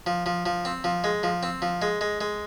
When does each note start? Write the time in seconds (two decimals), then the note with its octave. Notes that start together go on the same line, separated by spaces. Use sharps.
0.06 F3
0.26 F3
0.46 F3
0.65 C4
0.84 F3
1.04 G#3
1.23 F3
1.43 C4
1.62 F3
1.82 G#3
2.01 G#3
2.21 G#3